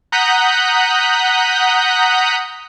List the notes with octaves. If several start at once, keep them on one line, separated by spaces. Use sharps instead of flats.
F#5 A#5 D#6 F#6 G6 B6